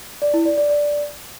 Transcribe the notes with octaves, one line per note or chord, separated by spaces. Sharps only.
D5
E4
D5
D5
D5